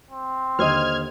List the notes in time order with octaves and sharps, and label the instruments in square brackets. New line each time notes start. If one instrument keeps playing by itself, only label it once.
[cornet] C4
[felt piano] D#2 D3 [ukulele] C5 D#5 [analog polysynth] F6 G#6